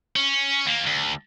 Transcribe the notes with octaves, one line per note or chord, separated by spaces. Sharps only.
C#4
D#2 A#3
D2